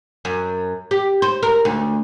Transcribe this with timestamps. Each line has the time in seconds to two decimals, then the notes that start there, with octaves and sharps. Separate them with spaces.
0.25 F#2
0.91 G4
1.22 C5
1.43 A#4
1.65 D2